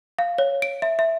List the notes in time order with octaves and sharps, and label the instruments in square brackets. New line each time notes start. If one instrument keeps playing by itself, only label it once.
[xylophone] F5
C#5
D7
E5
E5